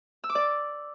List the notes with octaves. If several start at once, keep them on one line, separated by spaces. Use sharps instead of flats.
E6
D6
D5